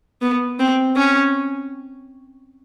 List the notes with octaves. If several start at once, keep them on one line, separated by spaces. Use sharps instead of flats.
B3
C4
C#4